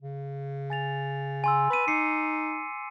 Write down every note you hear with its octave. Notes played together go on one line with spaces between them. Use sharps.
C#3
G#5 A6 F7
G#5 C6 E6
B4 G#5 B6 D#7
D#4 D6 C7 C#7